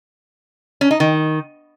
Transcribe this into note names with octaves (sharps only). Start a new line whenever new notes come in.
C#4
D#4
D#3